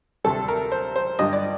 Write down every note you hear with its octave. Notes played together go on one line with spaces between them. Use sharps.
D2 C3 G3 A4
A#4
C5
C5
G2 D3 G3 D#5
D5